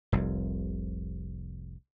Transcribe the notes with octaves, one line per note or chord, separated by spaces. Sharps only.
F1 C2